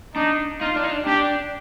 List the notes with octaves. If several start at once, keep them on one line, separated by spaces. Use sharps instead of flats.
D4 D#4
D#4 F4
D4
D#4
D4
D4 G4